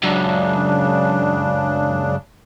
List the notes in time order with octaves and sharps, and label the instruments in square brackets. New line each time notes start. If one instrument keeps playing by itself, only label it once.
[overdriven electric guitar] C#2 F#2 [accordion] C#3 D4